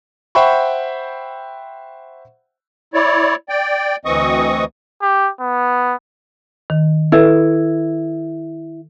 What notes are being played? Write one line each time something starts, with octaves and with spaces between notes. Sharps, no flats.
C5 E5 F#5 G5 B5 C#6
E4 C#5 D5
D5 G5
D2 E3 C4 D#5 C#6 D#6
G4
B3
D#3
E4 A4 B4